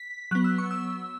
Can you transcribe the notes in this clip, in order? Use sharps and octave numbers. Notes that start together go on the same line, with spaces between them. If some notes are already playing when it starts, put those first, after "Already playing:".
Already playing: B6
F#3 B3 F#6
E6
C#6
E6